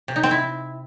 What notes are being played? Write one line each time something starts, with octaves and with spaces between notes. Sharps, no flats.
C3
D#4
C4
E4